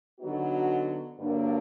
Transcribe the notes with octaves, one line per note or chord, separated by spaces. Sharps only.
D3 F#3 B3 D#4 F#4
G2 D3 F#3 A#3 D4